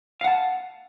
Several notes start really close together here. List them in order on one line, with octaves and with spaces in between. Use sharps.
F5 F#5 A5